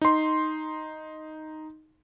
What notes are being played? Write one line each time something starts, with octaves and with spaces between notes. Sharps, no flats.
D#4 C6